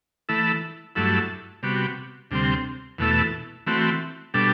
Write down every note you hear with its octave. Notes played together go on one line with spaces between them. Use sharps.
E3 A3 E4 A4
G2 F#3 A3 E4 A4
C3 G3 B3 F#4
D2 C3 G3 C4
E2 B2 A3 E4 A4
E3 A3 C4 F#4
B2 G3 D4 A4